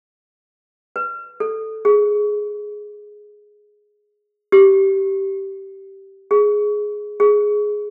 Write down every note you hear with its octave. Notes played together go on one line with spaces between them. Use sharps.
B4
A4
G#4
G4
G#4
G#4